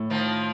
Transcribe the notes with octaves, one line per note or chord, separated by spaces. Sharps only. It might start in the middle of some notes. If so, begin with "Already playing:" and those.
Already playing: A2
D#3 F3